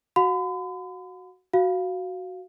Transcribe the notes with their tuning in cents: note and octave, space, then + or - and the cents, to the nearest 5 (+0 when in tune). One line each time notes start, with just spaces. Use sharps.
F#4 +0 F#5 -45 B5 +45
F#4 +0 F5 +0